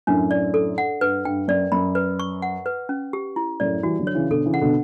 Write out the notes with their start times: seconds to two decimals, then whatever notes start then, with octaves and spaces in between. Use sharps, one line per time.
0.07 F#2 A2 D4
0.31 D5
0.54 A4
0.78 F#5
1.01 G2 B4
1.25 G2 G5
1.48 F#2 D5
1.72 F#2 B5
1.95 B4
2.20 C#6
2.42 F#5
2.66 B4
2.89 C#4
3.13 G4
3.36 E4
3.60 F#2 A2 D5
3.83 E3 G3 F#4
3.99 D3 F#3
4.07 C#5
4.15 C#3 E3
4.30 B2 D3 A4
4.46 C#3 E3
4.54 F#5
4.61 B2 D3